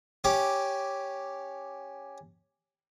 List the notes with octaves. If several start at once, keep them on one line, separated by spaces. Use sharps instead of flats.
C#4 G4 D6